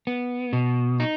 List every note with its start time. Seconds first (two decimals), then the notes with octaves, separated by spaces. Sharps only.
0.07 B3
0.53 B2
1.00 D#4